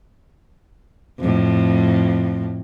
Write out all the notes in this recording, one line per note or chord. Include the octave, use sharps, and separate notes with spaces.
F2 A2